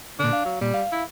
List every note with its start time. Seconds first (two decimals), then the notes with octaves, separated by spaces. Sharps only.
0.19 A#2 D3 D4
0.33 F5
0.45 F#3
0.61 A#2 G3
0.74 F5
0.92 E4